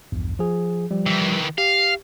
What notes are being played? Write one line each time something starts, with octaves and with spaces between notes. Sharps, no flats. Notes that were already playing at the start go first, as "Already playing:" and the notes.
A#1 E2 G2
F3 G#4
F3 G3
D#3 E3
G4 F5